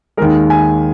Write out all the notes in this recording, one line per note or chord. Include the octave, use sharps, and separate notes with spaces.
D#2 D#3 G#3 A#4
G#5